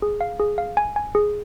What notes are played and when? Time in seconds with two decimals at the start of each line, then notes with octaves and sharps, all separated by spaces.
0.02 G#4
0.21 F5
0.40 G#4
0.58 F5
0.77 G#5
0.96 G#5
1.15 G#4